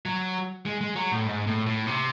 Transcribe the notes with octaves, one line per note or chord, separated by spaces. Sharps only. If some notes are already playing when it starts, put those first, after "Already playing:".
F#3
G#3
G#3
F#3
A2
G#2
A2
A2
C3